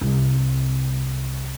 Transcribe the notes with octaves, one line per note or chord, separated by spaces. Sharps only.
C2